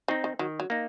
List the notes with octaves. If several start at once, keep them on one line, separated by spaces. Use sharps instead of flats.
D#3 C4 D#4
D#3
D#3 F#3
F#3
A#3 D#4